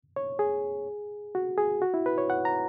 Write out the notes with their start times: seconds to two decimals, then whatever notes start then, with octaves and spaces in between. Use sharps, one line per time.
0.16 C#5
0.39 G#4
1.35 F#4
1.58 G#4
1.82 F#4
1.94 E4
2.06 B4
2.18 C#5
2.30 F#5
2.45 A#5